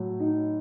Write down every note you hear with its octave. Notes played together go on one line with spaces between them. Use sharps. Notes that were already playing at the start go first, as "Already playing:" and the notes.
Already playing: A2 F#3
D#4